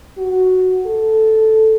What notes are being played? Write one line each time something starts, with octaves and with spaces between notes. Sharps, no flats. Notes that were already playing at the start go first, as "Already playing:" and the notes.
F#4
A4